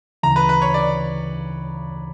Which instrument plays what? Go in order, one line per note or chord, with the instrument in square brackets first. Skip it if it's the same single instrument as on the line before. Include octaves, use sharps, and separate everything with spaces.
[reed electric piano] D2 C#3 E3 [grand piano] A#5
[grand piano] B4
B4
C#5
D5